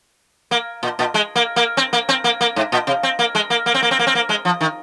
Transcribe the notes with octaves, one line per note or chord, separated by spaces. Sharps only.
A#3
A#2
A#2
G#3
A#3
A#3
C4
A#3
C4
A#3
A#3
G#2
A#2
C3
C4
A#3
G#3
A#3
A#3
C4
A#3
C4
A#3
C4
A#3
G#3
F3
D#3